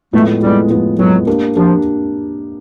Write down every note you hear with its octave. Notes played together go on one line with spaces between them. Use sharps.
A2 F3 G#3 A3 B3
A2 F3 G3 G#3 B3
A2 F3 G#3 B3
A2 F3 F#3 G#3 B3
A#3 D4 G4 A#4
F3 D4 G4 A#4